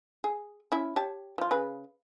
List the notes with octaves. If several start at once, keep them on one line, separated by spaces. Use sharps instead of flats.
G#4
C#4 E4
G4 C#5 A5
F3 F4
C#3 G#4 B4